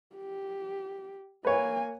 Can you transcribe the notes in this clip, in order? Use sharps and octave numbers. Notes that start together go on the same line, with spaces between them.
G4
A#3 B4 C#5 G#5